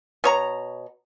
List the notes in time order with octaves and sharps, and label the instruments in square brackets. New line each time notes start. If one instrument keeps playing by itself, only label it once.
[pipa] B2 C#5 A#5